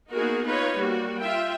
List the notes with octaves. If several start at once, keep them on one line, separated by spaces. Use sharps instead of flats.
A#3 B3 D#4 F#4 G#4 A#4
D#4 F4 B4 C#5
G3 A#3 F#4
F4 E5 G5